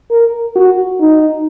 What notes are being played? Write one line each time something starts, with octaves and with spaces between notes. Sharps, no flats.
A#4
F#4
D#4